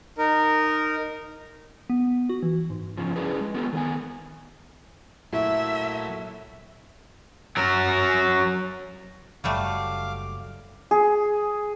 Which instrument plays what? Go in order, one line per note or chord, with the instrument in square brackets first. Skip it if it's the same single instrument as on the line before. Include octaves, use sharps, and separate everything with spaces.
[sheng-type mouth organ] D#4 A#4
[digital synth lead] B3
F#4
E3
G#2
[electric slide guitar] F#2 C#3 F3
C#4 D4 E4 G#4 B4
G#3
B3 C4 F4 G4 A4
D#3 B3 G#5
[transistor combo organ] A#2 F#3 A3 [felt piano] E4 [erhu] E5
[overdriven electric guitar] F#3 A#4
[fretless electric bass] F#1 [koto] F#3 G3 A3 [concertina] F5 D6
[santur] G#4